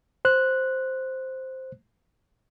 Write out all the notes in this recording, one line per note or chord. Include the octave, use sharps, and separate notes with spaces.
C5 F#6